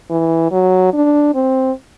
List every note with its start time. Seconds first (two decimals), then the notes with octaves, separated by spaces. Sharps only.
0.10 E3
0.52 F#3
0.93 D4
1.34 C4